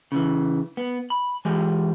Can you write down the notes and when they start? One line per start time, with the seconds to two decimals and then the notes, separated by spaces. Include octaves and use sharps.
0.12 C#3 E3
0.77 B3
1.10 B5
1.45 E3 G#3 G4 G#5